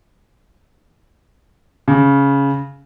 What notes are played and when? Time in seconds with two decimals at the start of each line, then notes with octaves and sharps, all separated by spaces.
1.88 C#3